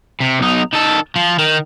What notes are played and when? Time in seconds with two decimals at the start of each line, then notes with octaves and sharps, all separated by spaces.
0.21 C3
0.40 B1 D#4
0.73 D#3 A4
1.16 F3
1.39 D#3